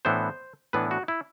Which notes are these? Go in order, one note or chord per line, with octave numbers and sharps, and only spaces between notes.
A2 E3 B3 D4 C5
A2 E3 B3 D4 B4
F#4
E4